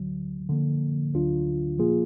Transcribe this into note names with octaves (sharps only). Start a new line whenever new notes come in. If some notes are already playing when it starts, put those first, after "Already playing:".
Already playing: D2 D3 F#3
D3 F3 A#3
D2 D3 F#3 D4 F4
A#2 F3 A#3 F4 G#4